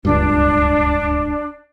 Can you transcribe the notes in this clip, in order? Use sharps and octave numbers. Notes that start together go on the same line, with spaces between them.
D1 C#2 G2 D4